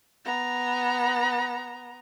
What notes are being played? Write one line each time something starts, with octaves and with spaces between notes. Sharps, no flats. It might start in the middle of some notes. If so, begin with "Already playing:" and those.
B3 A#5